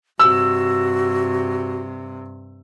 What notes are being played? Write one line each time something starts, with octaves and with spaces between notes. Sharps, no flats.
G2 C3 F#4 E6